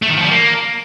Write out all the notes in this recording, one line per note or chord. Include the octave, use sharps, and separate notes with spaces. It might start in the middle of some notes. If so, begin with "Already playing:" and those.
A3
D#3
F3
G3
A#3